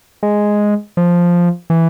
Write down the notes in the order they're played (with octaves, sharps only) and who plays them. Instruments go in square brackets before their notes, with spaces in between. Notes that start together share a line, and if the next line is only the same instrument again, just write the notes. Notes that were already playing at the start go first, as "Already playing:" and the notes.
[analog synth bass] G#3
F3
E3